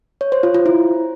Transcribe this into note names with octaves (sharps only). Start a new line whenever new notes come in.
C#5
C5
F4
F4
E4